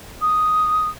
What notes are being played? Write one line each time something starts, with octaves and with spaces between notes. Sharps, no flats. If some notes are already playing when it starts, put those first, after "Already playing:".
D#6